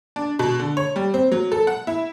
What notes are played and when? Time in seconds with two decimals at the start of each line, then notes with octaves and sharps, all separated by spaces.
0.16 D4
0.39 B2
0.59 D3
0.77 C#5
0.96 G3
1.14 C4
1.32 F#3
1.52 A4
1.67 F#5
1.87 E4